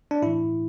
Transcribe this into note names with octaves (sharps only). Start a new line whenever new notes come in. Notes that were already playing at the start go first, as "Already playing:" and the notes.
D4
A2 E3 E4